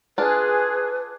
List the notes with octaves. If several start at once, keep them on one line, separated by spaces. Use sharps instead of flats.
D4 F4 G#4 B4